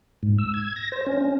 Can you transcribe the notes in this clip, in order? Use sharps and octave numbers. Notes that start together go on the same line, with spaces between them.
G#2
E6
G#6
A#6
C5
C#4
C#4